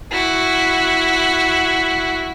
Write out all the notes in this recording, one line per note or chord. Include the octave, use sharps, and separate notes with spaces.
E4 F#4